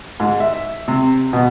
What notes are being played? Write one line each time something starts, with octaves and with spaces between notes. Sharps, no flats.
G#2
E5
C3
B2